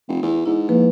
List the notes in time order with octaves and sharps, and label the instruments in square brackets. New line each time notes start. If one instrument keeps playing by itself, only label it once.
[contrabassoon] F1
E2
[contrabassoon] G#2 [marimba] E4
[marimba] F3 A#3 B4